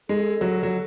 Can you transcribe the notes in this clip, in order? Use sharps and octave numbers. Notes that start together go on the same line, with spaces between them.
G#3 A4
F#3
F#3